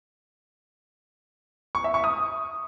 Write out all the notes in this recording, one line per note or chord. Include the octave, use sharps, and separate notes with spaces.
C#6
E5
C#6
D#6